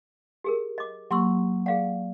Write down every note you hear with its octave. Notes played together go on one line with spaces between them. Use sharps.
G4 G#4 A#4
D#5 D6
F#3 A#3 G4 C6 C#6 E6
G#4 D5 F5 F#5